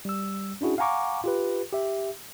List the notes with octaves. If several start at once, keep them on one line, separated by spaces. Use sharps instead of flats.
G3 E6
C#4 D4 E4 F#4 G#4
F5 F#5 G#5 A#5 C#6 D6
F4 G4 B4
G4 E5